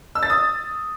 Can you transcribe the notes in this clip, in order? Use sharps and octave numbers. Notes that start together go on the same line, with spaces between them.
E6
A6
D#6